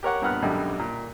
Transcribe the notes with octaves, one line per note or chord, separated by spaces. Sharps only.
G4 A#4 C#5 F#5
G2 A#2 B3 F#5 F6 F#6
G#1 F#2 B2 D3 G3
A#2